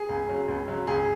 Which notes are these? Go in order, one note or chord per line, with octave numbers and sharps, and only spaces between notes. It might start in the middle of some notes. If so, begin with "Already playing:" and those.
Already playing: G#4
C#2
C#3 F#3
C#2
C#3 F#3
C#2 G#4